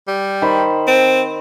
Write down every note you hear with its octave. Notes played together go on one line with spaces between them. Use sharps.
G3
D#3 C5 B5
C4